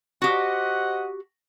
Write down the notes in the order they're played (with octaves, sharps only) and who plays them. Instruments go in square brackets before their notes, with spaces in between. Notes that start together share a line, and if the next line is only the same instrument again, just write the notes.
[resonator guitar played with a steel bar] F#4 G4 [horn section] C5 D#5 F#5